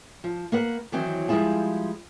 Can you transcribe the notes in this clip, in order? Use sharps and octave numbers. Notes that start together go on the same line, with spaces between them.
F3
A#3 B4 F#5
D#3 E3 F#3 C4
F3 G3 G#3 E4 F4 G#4